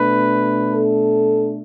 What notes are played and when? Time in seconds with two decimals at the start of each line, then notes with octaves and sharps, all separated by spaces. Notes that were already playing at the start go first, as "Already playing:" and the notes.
Already playing: B2 A3 D4 B4
0.75 A4